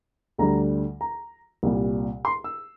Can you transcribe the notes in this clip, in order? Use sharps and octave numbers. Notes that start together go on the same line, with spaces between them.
D2 D3 G3 A#5
A#5
C2 A#2 G3
C6
E6